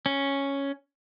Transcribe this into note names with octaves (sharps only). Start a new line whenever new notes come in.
C#4